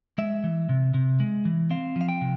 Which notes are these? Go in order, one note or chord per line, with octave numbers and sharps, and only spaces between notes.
G#3 E5
E3
C3
C3
G#3
E3
C4 F5
F3
F5
G5
C3